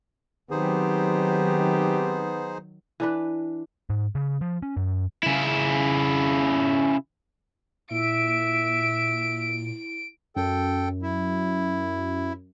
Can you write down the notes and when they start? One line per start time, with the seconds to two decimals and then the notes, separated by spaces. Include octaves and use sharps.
0.51 D#3 F#3 B3 C4 D#4 G4 G#4 C5
3.00 E3 D4 B4
3.90 G#2
4.15 C#3
4.41 F3
4.62 C#4
4.77 F#2
5.23 C#3 E4
7.91 A#2 E4 E5 D7
10.36 F#2 A4 G5
11.02 E4